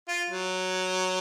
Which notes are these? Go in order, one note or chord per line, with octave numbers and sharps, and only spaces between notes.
F4
F#3